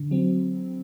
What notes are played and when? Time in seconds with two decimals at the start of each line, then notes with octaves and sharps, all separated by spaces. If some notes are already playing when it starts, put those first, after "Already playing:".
Already playing: D3
0.11 F#3 C4